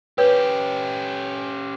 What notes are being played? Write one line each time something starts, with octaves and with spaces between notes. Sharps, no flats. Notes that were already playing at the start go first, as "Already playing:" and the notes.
C#4 G4 B4 C#5